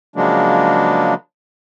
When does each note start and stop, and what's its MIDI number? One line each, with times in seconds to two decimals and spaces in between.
0.16 1.14 49
0.16 1.14 53
0.16 1.14 54
0.16 1.14 56
0.16 1.14 58
0.16 1.14 62